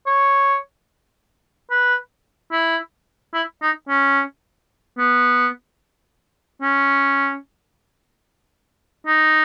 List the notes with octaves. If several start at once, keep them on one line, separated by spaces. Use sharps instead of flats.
C#5
B4
E4
E4
D#4
C#4
B3
C#4
D#4